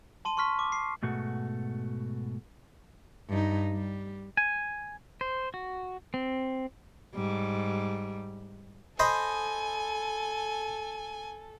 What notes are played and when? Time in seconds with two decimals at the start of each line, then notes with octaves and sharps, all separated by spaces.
0.25 A5 C6 D#7
0.37 C6 C#6 F6 B6
0.59 D6
0.72 C7
1.03 G#2 B2 A3 F#4
3.29 G2 D#4
3.72 G3
4.37 G#5
5.21 C5
5.54 F#4
6.14 C4
7.15 G#2 G3
8.99 A4 C5 D#5 G#5 B5